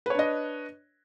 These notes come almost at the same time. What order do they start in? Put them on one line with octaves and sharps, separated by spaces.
B4 C#5 D4 D#5